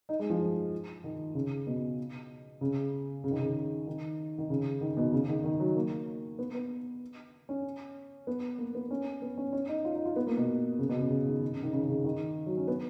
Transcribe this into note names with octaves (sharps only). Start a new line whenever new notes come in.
D#4
G#3
F3
D#3
C#3
B2
C#3
C#3
D#3
C#3
D#3
D#3
C#3
D#3
B2
C#3
D#3
D#3
F#3
A#3
B3
B3
C#4
B3
A#3
B3
C#4
B3
C#4
C#4
D#4
F4
D#4
F4
B3
A#3
B2
C#3
B2
C#3
C#3
D#3
C#3
D#3
C#3
C#3
D#3
F#3
C#4
B3